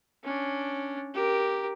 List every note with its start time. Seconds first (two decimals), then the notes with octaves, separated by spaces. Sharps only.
0.24 C#4 D4
1.14 G4 A#4